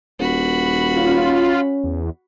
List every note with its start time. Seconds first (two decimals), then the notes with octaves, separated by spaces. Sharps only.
0.20 D#1 F#4 B5
0.96 C#4 F4
1.84 E2